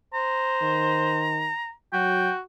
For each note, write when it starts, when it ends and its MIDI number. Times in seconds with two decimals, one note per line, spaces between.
0.14 1.42 72
0.14 1.72 82
0.62 1.51 51
1.93 2.30 54
1.93 2.40 66
1.93 2.32 79